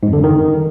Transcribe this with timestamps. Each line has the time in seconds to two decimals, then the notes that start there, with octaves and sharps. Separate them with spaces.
0.03 G#2
0.08 F2
0.13 D3
0.18 F#2
0.24 D#3